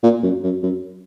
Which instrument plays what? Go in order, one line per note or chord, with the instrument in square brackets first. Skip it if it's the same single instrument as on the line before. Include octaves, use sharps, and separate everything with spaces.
[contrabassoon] A#2
F#2
F#2
F#2